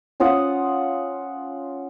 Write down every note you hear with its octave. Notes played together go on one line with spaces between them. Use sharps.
C#4 F4 F#5 D#6